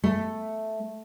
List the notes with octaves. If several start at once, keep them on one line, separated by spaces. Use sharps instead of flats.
A3